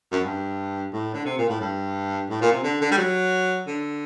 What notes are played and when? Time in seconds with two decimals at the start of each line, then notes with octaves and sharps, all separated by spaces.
0.11 F#2
0.24 G2
0.93 A2
1.14 D3
1.26 C3
1.38 A#2
1.49 A2
1.61 G2
2.29 A2
2.41 A#2
2.52 C3
2.63 D3
2.81 D3
2.91 G3
2.97 F#3
3.67 D3